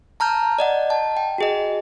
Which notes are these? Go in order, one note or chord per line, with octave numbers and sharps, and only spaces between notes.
A5 A#5 F6 G6
D5 D#5 F#5
A5
G5
F#4 G#4 D#5